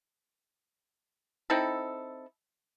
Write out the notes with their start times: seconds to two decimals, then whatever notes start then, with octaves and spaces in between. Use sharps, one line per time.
1.50 C4 D#4 E4 A4